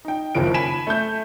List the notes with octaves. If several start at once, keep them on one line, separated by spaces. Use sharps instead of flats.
D#4 G5
F#1 D#2 C#3 F3 D7
G#5 B5 B6 E7
A3 G6